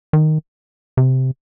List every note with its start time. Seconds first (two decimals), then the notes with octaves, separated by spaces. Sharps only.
0.13 D#3
0.97 C3